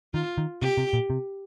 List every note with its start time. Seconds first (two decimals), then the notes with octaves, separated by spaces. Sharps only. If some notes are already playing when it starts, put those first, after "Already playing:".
0.14 D#3 F4
0.38 D#3
0.62 C3 G4
0.78 C3
0.93 A#2
1.10 C3